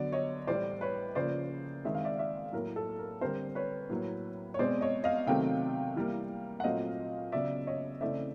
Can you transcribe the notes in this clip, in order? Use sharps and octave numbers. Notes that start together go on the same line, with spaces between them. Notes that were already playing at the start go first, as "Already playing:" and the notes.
Already playing: D3 F#3 B3 D5
C#5 D#5
A2 E3 G3 C5 D5
B4 C#5
C#3 F3 A#3 C5 D5
D#3 G#3 C4 E5
F5
D5 E5
D5 E5
A2 F#3 A#3 A#4
A4
A#4
D3 G3 C4 A#4 C5
B4 C#5
A2 F#3 A#3
C#5
B2 G#3 C4 C5 D5
C#5 D#5
D#5 F5
C3 D#3 F#3 A3 C4 F5 G5
E3 G3 A#3
F#5
A#2 F#3 A3 C4 D#5 F5
C#3 F#3 B3 D5 E5
C#5 D#5
C#3 E3 A3 C4 D5 E5